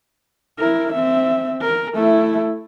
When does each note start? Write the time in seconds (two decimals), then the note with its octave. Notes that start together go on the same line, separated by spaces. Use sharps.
0.59 E4 A#4
0.93 C4 E5
1.61 A#4
1.95 A3 E4